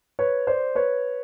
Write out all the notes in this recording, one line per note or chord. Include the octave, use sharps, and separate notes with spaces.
B4 C#5
C5 D5
B4 C#5